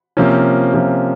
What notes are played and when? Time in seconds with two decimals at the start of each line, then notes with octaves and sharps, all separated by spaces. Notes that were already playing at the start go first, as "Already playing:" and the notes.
0.17 C3 F3 A#3 C#4
0.74 C3 F3 A#3 C#4